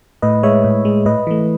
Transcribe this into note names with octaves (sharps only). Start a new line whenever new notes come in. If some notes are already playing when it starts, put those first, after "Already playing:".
A2 B4 D#5
G#3 C#5 E5
A2
G#3
A2 B4 D#5
E3 A3